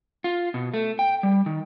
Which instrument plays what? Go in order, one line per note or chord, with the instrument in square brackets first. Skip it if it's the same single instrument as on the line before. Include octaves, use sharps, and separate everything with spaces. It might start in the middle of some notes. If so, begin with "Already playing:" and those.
[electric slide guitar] F4
B2
A3
G5
G3
D#3